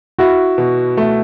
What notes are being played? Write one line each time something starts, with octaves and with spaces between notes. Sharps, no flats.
E4 F#4
B2
A3